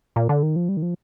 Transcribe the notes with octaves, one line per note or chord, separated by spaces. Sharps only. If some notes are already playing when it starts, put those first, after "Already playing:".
A#2
D3
D#3
F3
G3
D#3
F3